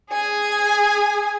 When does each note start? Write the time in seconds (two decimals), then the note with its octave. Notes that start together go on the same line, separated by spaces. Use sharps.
0.10 G#4 G#5